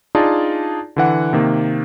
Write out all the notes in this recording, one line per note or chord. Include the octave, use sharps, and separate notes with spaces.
D4 D#4 F4 G#4 D5 A5
D3 E3 F#5
C3 D#3 A#3